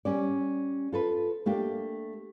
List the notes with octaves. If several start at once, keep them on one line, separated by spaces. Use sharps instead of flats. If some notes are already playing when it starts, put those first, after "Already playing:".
G3 C#4 D5
F4 A4 B4
A3 A#3 D4 G4